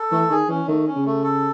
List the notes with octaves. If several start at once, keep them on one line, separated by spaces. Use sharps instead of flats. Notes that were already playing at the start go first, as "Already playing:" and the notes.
Already playing: A4
E3 A3
D#3 G#4
E3 C#4
D#3 A3
C#4
C#3
A3
A4